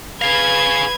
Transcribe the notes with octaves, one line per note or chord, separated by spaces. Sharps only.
G#4 B4 F5 G#6